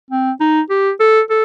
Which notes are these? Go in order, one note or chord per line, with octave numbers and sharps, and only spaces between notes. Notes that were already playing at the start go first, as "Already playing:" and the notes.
C4
D#4
G4
A4
A4